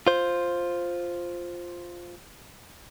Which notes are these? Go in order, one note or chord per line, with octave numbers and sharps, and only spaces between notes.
F4 C5